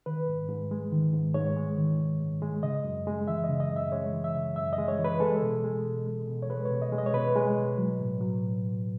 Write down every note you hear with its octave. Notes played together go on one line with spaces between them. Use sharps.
D#3 B4
G#2
G#2
G#3
D#3
G#2
G#2 C#5
G#3
D#3
G#2
G#2
G#3
C#3 D#5
F#2
G#3
E3 E5
D#5
C#3
D#5
F#2
E5
G#3 C#5
E3
E5
C#3
F#2 E5
D#5
G#3
C#5
E3
B4
G#3 A4
B2
G#3
B2
G#3
B2
C#5
G#3 B4
C#5
B2
D#5
G#3
D#5
C#5
B2 B4
G#3
B2
F#3
A2
F#3
A2